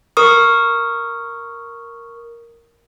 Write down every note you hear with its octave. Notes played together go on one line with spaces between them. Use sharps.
A#4 C#6 D#6